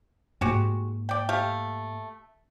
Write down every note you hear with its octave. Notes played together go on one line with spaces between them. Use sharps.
G#2 G#3 A#3 F#4 G4
D5 G5
A3 G4 F5